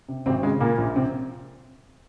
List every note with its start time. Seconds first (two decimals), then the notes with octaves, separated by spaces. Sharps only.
0.09 C3
0.26 G#1 C3 C4
0.43 C#3 G#3
0.60 A#2 A#3
0.78 A#1
0.95 C3 C4